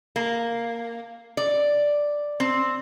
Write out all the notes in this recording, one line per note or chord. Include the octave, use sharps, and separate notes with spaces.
A#3
D5
C4